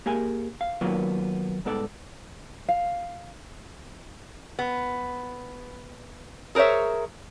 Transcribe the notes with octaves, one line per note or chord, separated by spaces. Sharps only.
A#3 G4 G#4 A#4 G#5
F5
D#3 F#3 A#3 B3 F4 D5
C2 G#2 B3 A4 D5
F5
B3
G#4 A#4 C5 C#5 E5